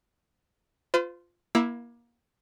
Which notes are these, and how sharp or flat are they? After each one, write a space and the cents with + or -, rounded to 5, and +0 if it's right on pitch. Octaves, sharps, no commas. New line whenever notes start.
F4 +0 C5 -45
A#3 +25 E4 +0 E6 +5